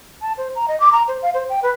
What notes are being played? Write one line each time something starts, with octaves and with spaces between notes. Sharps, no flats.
A5
C5
A#5
D#5
D6
A#5
C5
F5
C5
G5
B4